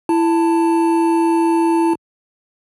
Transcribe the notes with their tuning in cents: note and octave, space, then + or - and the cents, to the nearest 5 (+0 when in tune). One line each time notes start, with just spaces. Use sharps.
E4 +15 A5 +15